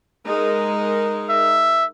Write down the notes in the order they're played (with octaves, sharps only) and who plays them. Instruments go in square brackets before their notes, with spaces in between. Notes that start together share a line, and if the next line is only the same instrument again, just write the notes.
[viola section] G#3 D#4 A#4
[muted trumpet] E5